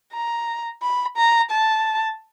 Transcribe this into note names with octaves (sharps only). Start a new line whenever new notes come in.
A#5
B5
A#5
A5